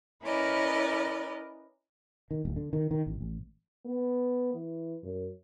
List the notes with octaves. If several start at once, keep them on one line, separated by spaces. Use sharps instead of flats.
C#4 E4 A#4 B4 D5 D#5
D#3
D1
D3
D#3
D#3
A1
A1
B3
E3
F#2